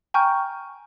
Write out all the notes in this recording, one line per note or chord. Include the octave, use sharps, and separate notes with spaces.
G5 G#5 A#5 C#6 F6 G6